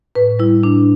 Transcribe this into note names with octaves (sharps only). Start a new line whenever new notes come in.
A2 B4
G3 E4
A2 D4